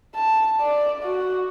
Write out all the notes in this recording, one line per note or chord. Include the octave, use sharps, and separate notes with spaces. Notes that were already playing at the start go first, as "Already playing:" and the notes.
A5
D5
F#4